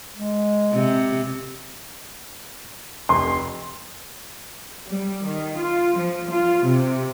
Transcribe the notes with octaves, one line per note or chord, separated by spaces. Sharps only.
G#3
C3
F1 C6
G3
D#3
F4
F3
F4
C3